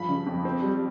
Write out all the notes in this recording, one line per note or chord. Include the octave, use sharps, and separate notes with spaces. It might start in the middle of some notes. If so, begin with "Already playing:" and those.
Already playing: G2 F3 B5
C#3
F2
C4
G3